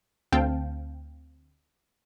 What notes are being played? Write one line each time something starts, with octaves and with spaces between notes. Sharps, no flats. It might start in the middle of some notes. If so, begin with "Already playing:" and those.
D2 C4 F5 G5 A5